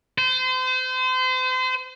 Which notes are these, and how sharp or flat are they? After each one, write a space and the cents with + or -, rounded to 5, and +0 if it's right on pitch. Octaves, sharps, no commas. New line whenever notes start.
C5 -35